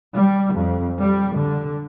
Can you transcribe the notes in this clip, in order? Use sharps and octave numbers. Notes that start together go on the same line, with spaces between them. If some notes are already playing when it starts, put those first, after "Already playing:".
G3
F2
G3
D3